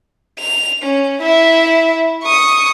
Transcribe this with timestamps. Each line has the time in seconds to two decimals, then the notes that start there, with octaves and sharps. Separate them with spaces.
0.39 F7
0.83 C#4
1.22 E4 E5
2.23 C#6 D#6